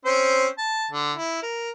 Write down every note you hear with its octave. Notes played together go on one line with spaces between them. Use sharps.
C4 C#4 C5
A5
D3
E4
A#4